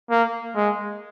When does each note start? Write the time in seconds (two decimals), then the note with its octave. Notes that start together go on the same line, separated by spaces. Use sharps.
0.10 A#3
0.56 G#3